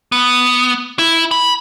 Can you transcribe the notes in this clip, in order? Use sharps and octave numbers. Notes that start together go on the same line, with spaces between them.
B3
E4
B5